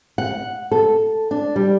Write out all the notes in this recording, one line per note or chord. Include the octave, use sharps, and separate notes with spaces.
F#5
A4
D4
G3